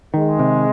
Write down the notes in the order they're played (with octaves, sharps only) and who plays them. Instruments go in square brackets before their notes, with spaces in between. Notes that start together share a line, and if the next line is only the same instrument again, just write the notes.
[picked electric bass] D#3 [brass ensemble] G#3
[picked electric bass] C3